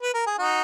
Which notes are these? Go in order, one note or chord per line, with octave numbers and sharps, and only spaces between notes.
B4
A#4
G#4
D#4 F#4